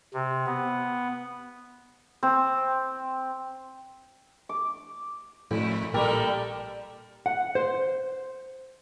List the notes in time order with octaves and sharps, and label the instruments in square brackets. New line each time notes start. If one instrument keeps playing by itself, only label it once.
[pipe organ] C3
B3
[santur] C4
[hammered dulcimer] D6
[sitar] F2 A3 E4 [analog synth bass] A2
[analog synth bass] A#1 [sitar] G3 A3 A#4 [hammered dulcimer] G4 A4
[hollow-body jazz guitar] F#5
C5